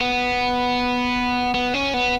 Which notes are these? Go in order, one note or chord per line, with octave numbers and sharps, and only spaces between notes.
B3
B3
C#4
B3